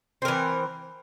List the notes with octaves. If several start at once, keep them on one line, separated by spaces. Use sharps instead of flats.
E3 C4 A#4